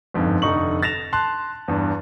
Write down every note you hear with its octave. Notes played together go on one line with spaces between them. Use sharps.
G1 F2 G#2
F1 D3 D#4 C#6 F#7
A6 A#6 E7 F7
A5 C6 F#6
E2 G2